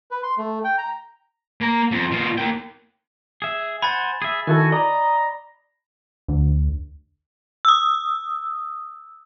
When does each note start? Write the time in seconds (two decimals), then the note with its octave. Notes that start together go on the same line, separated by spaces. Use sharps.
0.11 B4
0.23 C6
0.38 A3
0.64 G5
0.78 A#5
1.61 A#3 A#5
1.91 F2
2.11 B2 F4
2.38 A#3 G5
3.42 G#4 E5
3.82 C5 F#5 G#5 B5 A6
4.22 G#4 E5
4.47 D#3 E4 F#4 A4 G#5
4.72 D5 D#5 A#5
6.28 D2
7.65 D#6 E6